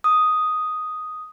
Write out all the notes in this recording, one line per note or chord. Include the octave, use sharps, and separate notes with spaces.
D#6